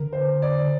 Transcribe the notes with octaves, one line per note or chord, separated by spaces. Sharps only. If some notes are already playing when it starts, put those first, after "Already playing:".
Already playing: D3 A#4
C5
D5